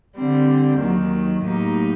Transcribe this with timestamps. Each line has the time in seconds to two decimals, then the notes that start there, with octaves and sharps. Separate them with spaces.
0.16 D3 G3 C4
0.79 D#2 D#3 F#3
1.44 A2 F#3 A#3 D#4 G4